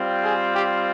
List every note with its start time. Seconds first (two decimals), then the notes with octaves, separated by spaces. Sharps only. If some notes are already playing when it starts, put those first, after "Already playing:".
Already playing: G3 C4 F4
0.24 G#4
0.54 G4